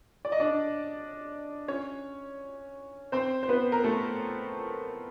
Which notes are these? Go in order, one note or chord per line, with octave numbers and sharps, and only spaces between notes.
D5
D#5
D4 D5
C#4 C#5
C4 C5
C5
B3 B4
A#4
A3 A4